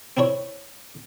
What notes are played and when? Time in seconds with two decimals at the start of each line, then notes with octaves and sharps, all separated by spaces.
0.17 C4 D4 E4 C#5